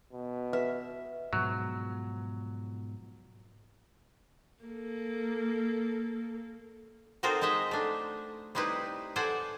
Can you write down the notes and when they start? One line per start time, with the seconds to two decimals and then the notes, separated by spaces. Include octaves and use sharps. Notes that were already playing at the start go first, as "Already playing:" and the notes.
0.13 B2
0.53 B4 E5
1.33 G#2 B2 F3 F#3
4.64 A#3 A4
7.23 C4 D#4 F#4 A4 A#4 C5
7.41 G#3 D#4 D#5 E5
7.71 A3 D4
8.55 G3 C4 D#4 E4 B4
9.16 A4 C5 D5 F#5 G#5